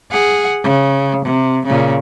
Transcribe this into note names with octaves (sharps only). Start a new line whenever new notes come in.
G#4 F#5
C#3
C3
A#2 C#3